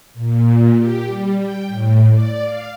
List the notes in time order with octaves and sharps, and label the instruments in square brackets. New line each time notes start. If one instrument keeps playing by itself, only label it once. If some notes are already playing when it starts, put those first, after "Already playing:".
[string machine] A#2
G4
G3
G5
A2
D5
F5